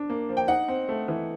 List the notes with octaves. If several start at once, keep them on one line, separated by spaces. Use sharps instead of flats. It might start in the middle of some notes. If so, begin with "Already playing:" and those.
Already playing: D4
A#3
F3
G5
D#4 F#5
C4
A3
E3